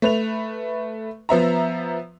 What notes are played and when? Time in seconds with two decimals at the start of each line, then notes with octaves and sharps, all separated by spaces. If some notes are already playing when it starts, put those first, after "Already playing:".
0.02 A3 B4 F7
1.29 F3 B3 E5 A#5